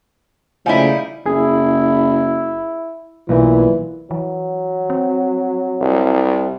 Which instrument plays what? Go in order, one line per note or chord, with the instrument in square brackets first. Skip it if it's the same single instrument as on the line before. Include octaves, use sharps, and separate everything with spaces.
[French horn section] A#2 C#3 A3 [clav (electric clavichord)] F3 G#5 [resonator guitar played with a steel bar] G3 D#4 E4
[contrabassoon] F#1 [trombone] E4 [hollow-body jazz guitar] G#4
[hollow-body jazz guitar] B1 [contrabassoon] A#2 [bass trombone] E3
[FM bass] E3 [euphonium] F#3
[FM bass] C4
[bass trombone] C2